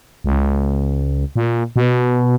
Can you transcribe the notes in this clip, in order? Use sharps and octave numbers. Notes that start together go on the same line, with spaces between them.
C#2
A#2
B2